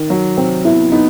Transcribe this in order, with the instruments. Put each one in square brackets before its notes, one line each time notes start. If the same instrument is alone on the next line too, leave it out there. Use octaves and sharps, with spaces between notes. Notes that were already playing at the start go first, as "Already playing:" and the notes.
Already playing: [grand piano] D#3
F#3
[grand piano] C3 [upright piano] C4
[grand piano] B3 [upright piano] E4
[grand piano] B3 [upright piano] D#4